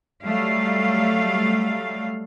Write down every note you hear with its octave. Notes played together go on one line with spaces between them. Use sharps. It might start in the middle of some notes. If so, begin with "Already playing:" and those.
F#3 G3 A3 F5